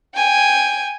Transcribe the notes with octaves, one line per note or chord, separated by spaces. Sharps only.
G5 G#5